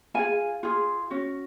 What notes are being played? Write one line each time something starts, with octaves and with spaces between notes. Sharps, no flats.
F4 G#4 G#5
F4 G#4
C#4 F#4